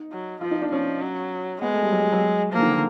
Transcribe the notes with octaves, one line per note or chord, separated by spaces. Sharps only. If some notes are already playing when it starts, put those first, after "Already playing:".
Already playing: D#4
F#3
F3 F4
D#4
D4
F3 C#4
F#3
G#3 B3
A3
G3
F#3
G3
F#3
F3 A#3
D3
D#3
D3